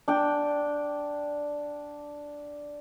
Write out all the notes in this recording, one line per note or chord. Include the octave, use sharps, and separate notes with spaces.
D4 G5